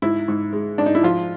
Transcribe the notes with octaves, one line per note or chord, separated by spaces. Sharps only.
G#2 E4
G#2
G#3
G#2 D4
D#4
E4
F3 F4